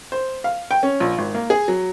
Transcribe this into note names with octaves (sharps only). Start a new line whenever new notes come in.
C5
F5
G5
C#4
A#1
G#1
A#3
G#4
F#3